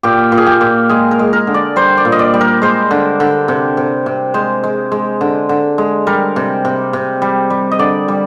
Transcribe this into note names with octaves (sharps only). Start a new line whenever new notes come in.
A#2 G4
A#2
G#4
G4
A#2
G#3 G#4
A#4
G#3
A#4
D3
D5
G3 C5
D5
A#2
D#5
D5
G3
A#4
G#3 C5
D3
D3
C3
C3
C3
G#3 C5
G#3
G#3
D3
D3
G#3
G3 A#4
C3
C3
C3
G3
G3
D#5
D3 D5
G3